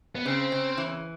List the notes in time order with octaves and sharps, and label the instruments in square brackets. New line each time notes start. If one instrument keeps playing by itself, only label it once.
[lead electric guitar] B3
[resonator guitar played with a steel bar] C#3 [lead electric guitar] C4
[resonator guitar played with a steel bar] C#3
E3